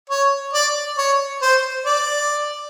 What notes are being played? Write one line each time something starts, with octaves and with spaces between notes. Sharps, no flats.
C#5
D5
C#5
C5
D5